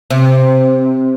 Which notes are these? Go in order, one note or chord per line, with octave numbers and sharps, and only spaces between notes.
C3